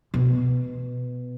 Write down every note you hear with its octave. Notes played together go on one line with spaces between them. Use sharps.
B2